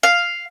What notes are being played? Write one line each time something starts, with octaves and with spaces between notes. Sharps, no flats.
F5